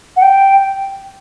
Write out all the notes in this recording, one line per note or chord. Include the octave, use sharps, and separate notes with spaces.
F#5
G5